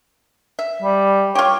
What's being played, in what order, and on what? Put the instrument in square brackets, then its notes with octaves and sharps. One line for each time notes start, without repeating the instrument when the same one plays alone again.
[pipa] E5
[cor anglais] G3
[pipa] F4 G4 [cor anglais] C#5